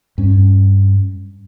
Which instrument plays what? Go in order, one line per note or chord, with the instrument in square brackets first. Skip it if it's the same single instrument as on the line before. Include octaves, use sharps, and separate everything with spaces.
[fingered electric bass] G2 C#4